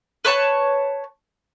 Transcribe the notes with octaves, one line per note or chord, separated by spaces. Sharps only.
B4 C#5 A5 C#6